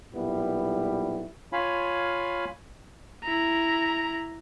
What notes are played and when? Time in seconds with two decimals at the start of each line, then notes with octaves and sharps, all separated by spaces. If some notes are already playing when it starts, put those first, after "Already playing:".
0.14 B1 A#2 G3 B3 E4
1.53 F4 C#5 F5 G#5 B5
3.23 E4 A#5